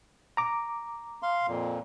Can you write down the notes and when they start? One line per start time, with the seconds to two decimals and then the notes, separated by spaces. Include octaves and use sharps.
0.37 A#5 D6
1.22 F5 C6
1.48 F2 A#2